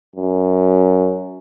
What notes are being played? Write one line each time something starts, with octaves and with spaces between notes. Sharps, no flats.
F#2